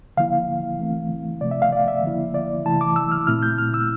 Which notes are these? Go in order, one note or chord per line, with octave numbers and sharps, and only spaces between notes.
D3 F3 A#3 E4 F5
E3 A3 C4 E4
C3 F3 A3 D5
E5
F5
D5
E5
D3 F3 A#3 E4
D5
C3 E3 A3 E4 A5
D6
E6
F6
A#2 A3 C4 E4 F6
G6
F6
E6